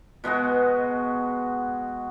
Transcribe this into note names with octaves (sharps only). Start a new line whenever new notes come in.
B2 G#3 B3 F#4